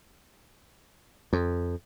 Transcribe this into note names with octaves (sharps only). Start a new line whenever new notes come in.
F2